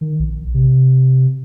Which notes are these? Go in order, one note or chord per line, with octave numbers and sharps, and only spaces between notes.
D#3
A#1
C3